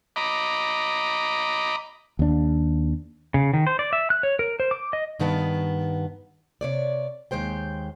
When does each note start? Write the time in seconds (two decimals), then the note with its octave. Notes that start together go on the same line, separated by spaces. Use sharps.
0.16 D#5 A#5 B5 D6
2.19 D#2 D4
3.34 C#3
3.54 D#3
3.67 C5
3.79 D5
3.93 E5
4.10 F#6
4.23 C#5
4.39 A#4
4.60 C5
4.71 D6
4.93 D#5
5.19 G2 D#3 B3 A5
6.61 C3 C#5 D5
7.31 D#2 G#3 C5 G5